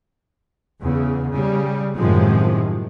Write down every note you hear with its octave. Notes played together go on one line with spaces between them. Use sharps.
E2 C#3
C#3 G3
F#2 A2 C3 D#3 F3 G#3